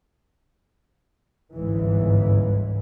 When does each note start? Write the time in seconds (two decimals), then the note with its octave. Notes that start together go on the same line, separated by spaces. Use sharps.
1.54 G1 C#2 G#2 E3